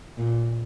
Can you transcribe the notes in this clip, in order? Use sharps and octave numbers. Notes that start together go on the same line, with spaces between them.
A#2